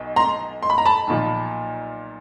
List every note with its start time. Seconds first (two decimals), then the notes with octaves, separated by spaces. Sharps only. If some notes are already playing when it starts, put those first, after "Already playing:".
Already playing: B1 B2
0.16 A#5 C6
0.63 C6
0.70 B5
0.78 A#5
0.85 A5 B5
1.07 B1 A#2 F3